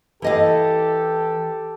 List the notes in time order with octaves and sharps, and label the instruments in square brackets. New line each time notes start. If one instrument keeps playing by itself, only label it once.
[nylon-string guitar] E3 D#5 F5 [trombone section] G4 A4